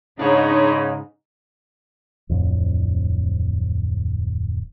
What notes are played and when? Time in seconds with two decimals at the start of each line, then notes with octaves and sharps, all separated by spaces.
0.19 G#2 C#3 D4 D#4 C#5
2.29 D1 F2